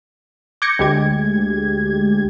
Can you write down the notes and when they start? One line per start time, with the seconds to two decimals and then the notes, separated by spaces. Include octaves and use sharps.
0.62 D6 G6 G#6 A#6 C#7
0.79 D2 G#3 G4 G#6